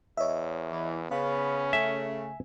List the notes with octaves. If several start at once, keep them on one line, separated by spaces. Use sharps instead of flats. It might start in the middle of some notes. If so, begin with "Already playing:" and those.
E2 C#5 D#5 E5
E3
C#3 B3 C#4 F5 B5
C#3 A3 E5 G#5